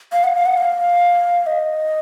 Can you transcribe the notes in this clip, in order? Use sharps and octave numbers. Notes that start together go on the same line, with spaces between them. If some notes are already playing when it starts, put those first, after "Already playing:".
F5
F#5
F5
F#5
F5
D#5